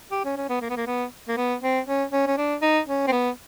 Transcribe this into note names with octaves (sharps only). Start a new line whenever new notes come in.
G4
C#4
C#4
B3
A#3
B3
A#3
B3
A#3
B3
C4
C#4
C#4
C#4
D4
D#4
C#4
C4
B3